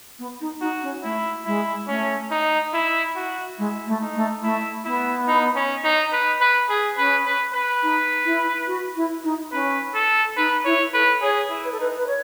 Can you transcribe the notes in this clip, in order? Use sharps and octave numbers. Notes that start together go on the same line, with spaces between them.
B3
D#4
D#4 F#4
C#4
A3 E4
G#3 E4
A3 C#4
D#4
E4
F#4
G#3 E4
A3
D#4
A3
A3 E4
B3 E4
D#4
C#4
D#4
B4
B4
G#4
C#4 B4
B4
B4
D#4
E4
F#4
E4
D#4
C#4 B4
A4
D#4 B4
E4 C#5
A4 B4
G#4 C#5
E4
B4
A4
D#4 B4
B4
C#5